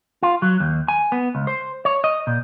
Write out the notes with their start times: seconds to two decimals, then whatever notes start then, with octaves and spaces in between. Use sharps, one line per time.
0.23 F4
0.42 F#3
0.60 D#2
0.88 G#5
1.12 B3
1.35 C#2
1.47 C5
1.85 C#5
2.04 D#5
2.27 A#2